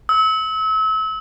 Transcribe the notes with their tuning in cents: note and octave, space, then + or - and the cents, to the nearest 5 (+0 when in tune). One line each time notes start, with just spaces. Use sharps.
E6 -35